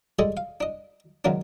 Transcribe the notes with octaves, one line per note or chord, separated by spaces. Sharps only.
G3 G#3 G#4 A4 D5 D#5
F5
D4 D#5
C#2 F#2 D#3 F#3 A#3 D4